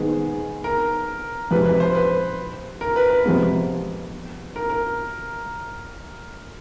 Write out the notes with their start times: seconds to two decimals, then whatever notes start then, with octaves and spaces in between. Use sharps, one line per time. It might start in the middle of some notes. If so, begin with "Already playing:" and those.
Already playing: G#2 D#3 G#3 B3 G#4
0.64 A#4
1.51 F2 C3 F3 G#3 B4
1.66 B4
1.80 C5
1.95 B4
2.81 A#4
2.96 B4
3.10 B4
3.25 F2 C3 F3 G#3 B3
4.56 A#4
4.70 A#4